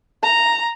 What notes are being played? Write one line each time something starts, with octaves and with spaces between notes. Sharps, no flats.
A#5